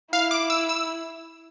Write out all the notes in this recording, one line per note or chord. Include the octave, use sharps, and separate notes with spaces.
E4 F5
D6
E6
E6